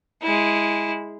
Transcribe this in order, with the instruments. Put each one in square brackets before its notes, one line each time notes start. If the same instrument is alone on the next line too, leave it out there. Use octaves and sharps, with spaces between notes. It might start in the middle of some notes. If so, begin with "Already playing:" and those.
[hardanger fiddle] G#3 E4